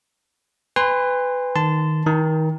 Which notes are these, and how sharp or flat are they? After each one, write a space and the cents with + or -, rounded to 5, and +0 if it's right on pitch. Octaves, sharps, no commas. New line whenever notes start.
B4 +20 G#5 -40 C6 +0
D#3 +0 A5 +0 C6 -25
D#3 +25 A#5 -35